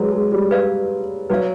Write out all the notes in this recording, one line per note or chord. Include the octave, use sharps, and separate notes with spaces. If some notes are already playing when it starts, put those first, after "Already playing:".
Already playing: F#3 G#3 B4
G#3
G3
B4 D5 F5
F#3 B4 D5 F5